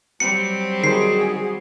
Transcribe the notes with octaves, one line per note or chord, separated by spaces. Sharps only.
F#3 G3 C4 C#7
D#3 F#4 G#4 C5 C7